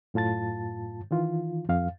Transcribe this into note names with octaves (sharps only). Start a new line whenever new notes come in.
F#2 A2 F4 A5 A6
D#3 E3 F4
F2 F5